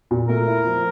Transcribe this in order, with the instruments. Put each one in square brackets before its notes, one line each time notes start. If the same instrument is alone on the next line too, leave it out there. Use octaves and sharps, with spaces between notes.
[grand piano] A#2
[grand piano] A3 [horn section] A#4
[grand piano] E4
F3